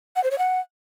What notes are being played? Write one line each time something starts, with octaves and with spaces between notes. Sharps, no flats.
F#5
C5
C#5
F#5